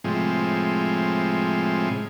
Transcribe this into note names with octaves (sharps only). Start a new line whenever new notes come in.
A2 C3 F3 G#3